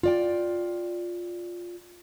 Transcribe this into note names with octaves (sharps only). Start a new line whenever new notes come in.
F4 D5 G5